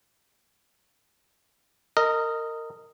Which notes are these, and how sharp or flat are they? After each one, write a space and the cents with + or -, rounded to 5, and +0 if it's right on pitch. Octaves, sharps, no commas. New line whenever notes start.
A#4 -25 D#5 +0